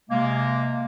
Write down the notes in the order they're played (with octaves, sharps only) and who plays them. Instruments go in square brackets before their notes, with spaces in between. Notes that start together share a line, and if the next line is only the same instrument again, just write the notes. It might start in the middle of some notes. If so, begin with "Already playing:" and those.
[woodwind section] C3 G#3 A#3